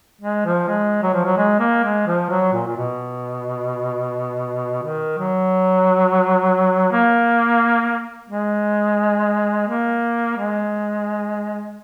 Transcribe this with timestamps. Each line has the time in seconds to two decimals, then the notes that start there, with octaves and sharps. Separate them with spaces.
0.21 G#3
0.45 F3
0.68 G#3
1.03 F#3
1.14 F3
1.25 F#3
1.37 G#3
1.60 A#3
1.83 G#3
2.07 F3
2.29 F#3
2.53 A#2
2.67 A#2
2.76 B2
4.83 D#3
5.18 F#3
6.92 A#3
8.29 G#3
9.68 A#3
10.37 G#3